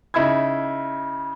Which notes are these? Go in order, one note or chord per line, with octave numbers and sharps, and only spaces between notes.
C#3 D#4 E4 B5 E6 G#6